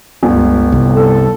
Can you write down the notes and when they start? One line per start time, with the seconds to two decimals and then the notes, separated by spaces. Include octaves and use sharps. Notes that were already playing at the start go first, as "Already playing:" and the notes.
0.23 G1 C#2
0.72 C2
0.94 A4